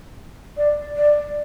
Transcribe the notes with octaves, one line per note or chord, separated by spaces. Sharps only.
D5
D5